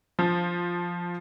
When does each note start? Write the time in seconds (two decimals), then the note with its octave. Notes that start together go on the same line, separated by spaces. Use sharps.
0.19 F3